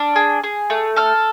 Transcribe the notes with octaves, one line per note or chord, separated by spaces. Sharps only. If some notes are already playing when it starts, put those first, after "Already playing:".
Already playing: D4 F6
G#4
G#4
A3
A4 F6